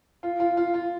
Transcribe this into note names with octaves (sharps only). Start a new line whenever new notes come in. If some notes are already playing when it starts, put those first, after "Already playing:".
F4
F4
F4
F4